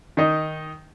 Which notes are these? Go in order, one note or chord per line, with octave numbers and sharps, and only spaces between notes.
D#3 D#4